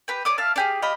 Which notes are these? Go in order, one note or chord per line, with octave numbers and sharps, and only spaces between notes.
G4 B4 G5
C#5 D5 D6 D#6
E5 F5 A5 F6
D4 G4 G#4
F4 G4 D#5 B5